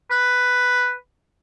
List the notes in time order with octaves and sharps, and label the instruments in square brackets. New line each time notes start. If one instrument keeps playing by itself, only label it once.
[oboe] B4